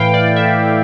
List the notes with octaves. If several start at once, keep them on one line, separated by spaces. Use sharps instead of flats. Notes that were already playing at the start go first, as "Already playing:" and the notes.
Already playing: A2 E3 A3 E4 F5 G5
D5
E5